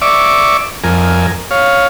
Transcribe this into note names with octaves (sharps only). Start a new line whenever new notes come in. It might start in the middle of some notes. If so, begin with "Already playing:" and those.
D5 E5 C#6 D6
F2 A#4 G#5
C#5 F5